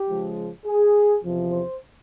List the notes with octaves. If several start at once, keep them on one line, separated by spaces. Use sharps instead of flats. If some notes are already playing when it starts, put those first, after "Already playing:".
Already playing: G4
C#3 F3 G#3
G#4
E2 C3 F3
C5